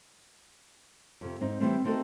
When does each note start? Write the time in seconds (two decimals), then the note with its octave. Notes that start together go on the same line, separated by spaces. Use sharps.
1.21 F2 C3
1.41 G#2 C4 D#4
1.60 E3 G3 A3 C4
1.84 A3 C4 D#4 F#4 A4 A#4